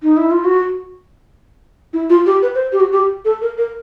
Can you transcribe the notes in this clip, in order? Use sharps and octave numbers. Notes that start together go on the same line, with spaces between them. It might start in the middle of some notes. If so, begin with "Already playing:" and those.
D#4
E4
F4
F#4
E4
F4
G4
B4
C5
G4
F#4
G4
A4
A#4
A#4